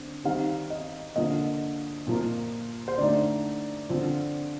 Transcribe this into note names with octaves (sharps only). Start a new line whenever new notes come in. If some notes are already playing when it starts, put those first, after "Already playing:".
Already playing: D3 C4
D#3 G3 C4 D#4 F5
D#5
D3 F3 A#3 D#5
A#2 F3 A#3
C5
D3 A3 D#4 D5
D3 F3 C4